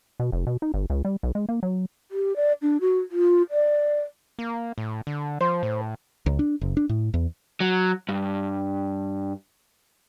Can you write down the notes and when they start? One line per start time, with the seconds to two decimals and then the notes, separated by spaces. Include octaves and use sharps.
0.20 B2
0.32 F1
0.47 B2
0.62 D#4
0.74 G1
0.90 C#2
1.05 G3
1.23 B1
1.35 G#3
1.49 A#3
1.63 F#3
2.11 G4
2.36 D5
2.62 D4
2.81 F#4
3.11 F4
3.51 D5
4.39 A#3
4.78 A2
5.07 D3
5.41 F3 C5
5.63 A2
6.26 C#2
6.39 D4
6.61 F#1
6.77 D4
6.89 A2
7.14 E2
7.60 F#3
8.09 G2